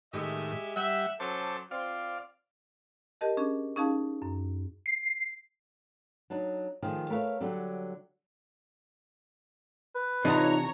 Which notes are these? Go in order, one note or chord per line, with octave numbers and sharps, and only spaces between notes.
A2 D#3 G#3 G4 E5
G3 E5 F#5
F#3 C#4 A4 C5 A5 D6
C4 F4 D5 F5
G4 A#4 D#5 A5
C#4 D4 G#4
C#4 D#4 G#4 F5 A5
F#2
C7
F#3 D4 D#4
D#3 F3 A3 F4 G#4
A3 A#4 B4 C#5 E5 F5
D3 F#3 G3 D4
B4
C3 E3 D4 D#4 F4 C#5 A#5